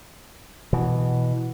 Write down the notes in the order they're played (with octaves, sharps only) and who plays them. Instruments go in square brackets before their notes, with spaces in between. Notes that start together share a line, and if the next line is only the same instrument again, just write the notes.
[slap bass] B2 E3